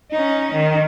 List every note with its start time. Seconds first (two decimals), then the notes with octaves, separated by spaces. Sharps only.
0.12 C#4 D#4
0.53 D#3